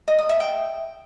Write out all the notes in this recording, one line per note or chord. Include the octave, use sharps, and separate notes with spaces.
D#5
D#6
E5
G5